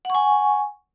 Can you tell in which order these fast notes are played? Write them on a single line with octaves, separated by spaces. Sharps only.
F#5 C#6 G#5